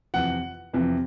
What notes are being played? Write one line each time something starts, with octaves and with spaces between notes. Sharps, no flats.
F2 C3 E3 F#5
F2 C3 E3